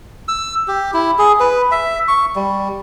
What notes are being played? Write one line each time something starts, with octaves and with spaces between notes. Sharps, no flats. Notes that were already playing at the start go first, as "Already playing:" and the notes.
E6
G4
E4
G#4
B4
E5
C#6
G3